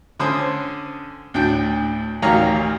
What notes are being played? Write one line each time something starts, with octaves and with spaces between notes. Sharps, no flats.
D3 C#4 C5 D#6
D2 A2 D4 G5
A1 D2 D#3 C#5 F5 A#5